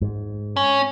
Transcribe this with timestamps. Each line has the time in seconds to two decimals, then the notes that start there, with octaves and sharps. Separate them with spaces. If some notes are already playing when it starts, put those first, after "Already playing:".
0.02 G#2
0.56 C#4